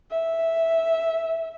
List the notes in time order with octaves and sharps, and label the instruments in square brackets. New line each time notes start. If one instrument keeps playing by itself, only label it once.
[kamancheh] E5